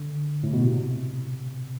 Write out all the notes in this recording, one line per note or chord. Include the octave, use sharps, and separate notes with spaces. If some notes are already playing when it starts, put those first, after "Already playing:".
Already playing: D3
A2
B2
C3